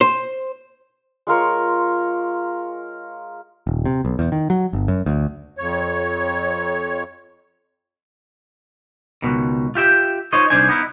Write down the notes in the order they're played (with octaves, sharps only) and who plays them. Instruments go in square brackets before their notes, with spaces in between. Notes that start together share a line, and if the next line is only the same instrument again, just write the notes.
[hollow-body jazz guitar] C5
[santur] G#3 F4 A#4 C#5
[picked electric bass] D#1
C3
B1
E2
D#3
F#3
G1
F#2
D2
[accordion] F2 C#5
[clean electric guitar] C#2 G#2 B2 D#3
F4 G4 E5 G5
D#4 F4 C5 C#5 D#5
C2 F#2 D4 D#4 C5 G#5
B3 D#4 E4